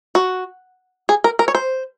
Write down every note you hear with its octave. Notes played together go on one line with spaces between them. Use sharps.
F#4
G#4
A#4
A#4
C#5
C5